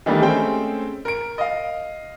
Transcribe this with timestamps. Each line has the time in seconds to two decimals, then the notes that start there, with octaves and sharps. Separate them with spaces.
0.06 D#3 E3 G3 A3 A#3 D4
0.21 G#3 A3 C4 C#4 C5 G5
1.05 A#4 D7
1.38 D#5 F5